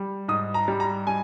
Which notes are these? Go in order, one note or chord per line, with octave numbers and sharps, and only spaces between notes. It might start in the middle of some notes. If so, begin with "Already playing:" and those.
Already playing: G3
G#2 D#6
A#5
G3
A#5
G3 G#5